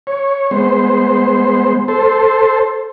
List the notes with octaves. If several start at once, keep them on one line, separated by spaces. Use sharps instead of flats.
C#5
G#3 B3 C5
A4 C5